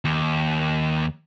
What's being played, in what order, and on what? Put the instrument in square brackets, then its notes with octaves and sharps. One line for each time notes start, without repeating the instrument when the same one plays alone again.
[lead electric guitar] D#2